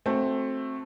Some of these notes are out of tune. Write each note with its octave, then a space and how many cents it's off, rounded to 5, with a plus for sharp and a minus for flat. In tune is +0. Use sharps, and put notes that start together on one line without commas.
A3 +0 C4 +15 F#4 +0